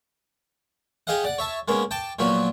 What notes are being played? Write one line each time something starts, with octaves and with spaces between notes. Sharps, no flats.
G4 G#4 D#5 F5 F#5
D5 F#5
C#5 E5 A5
G#3 A#3 B3 C#4
G5 A5 D6
A#2 F3 F#3 B3 F#4